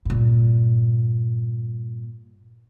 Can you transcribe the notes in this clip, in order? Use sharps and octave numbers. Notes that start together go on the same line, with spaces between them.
G2 A#2